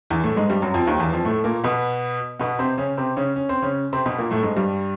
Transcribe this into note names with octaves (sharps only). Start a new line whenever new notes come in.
E2 E3
A2 A3
G#2 G#3
G2 G3
F#2 F#3
F2 F3
D#2 D#3
E2 E3
F2 F3
A2 A3
A#2 A#3
B2 B3
B2 B3
C3 C4
C#3 C#4
C3 C4
C#3 C#4
C#4
C4
C#3 C#4
C3 C4
B2 B3
A#2 A#3
A2 A3
G#2 G#3
G2 G3